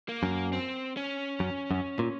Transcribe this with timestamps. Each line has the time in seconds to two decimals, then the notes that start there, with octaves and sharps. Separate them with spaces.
0.09 A#3
0.23 F#2
0.53 C4
0.97 C#4
1.40 F#2
1.71 F#2
1.99 A#2